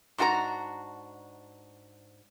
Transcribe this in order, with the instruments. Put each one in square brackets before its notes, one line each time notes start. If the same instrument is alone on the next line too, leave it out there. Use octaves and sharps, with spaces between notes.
[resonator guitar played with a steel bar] G#2 D4 F#4 G4 A#5